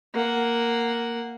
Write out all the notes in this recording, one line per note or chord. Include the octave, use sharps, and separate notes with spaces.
A#3 F#5